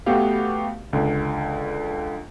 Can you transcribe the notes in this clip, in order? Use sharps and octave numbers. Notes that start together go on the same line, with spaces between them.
A3 B3 F#4 G4 F5
C#2 D3